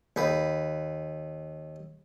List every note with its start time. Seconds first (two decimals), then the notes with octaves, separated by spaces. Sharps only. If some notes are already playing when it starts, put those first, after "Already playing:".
0.16 D#2 B4